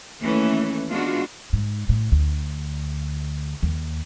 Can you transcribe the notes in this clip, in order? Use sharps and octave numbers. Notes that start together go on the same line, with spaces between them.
D#2 E3 A3 C#4
G#3 B3 D4 F4 F#4
G#2
A2
D2
D#2